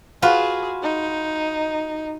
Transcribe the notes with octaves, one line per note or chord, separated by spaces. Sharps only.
F4 F#4 G#4 B4
D#4